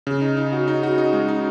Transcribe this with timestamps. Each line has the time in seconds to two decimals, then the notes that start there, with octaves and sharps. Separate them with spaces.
0.07 C#3
0.21 D#4
0.37 D#4
0.52 F#4
0.68 D#4
0.83 F#4
0.98 D#4
1.13 G#3
1.28 D#4